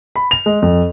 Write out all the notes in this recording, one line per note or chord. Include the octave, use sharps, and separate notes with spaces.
B5
F7
G#3
F2